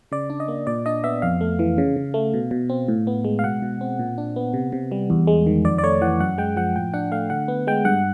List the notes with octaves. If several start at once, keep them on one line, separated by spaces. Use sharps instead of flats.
C#3 D5
D4
D#5
A#3
A#2 D5
D4 D#5
B3 E5
F2 F5
A3
E3
C#3
C#3
A3
B2
B2
C4
A2
B3
G#3
F5
B2 F#5
B2
C4
A#2
D4
B3
C3
C3
G3
E2
G#3
D#3
F2 D5
D5
A3 C#5
E3 F#5
F#2 F#5
G#3 G5
F3 F#5
A2 G5
D4 F#5
A3 F5
D3 F#5
B3
G#3 G5
G2 F#5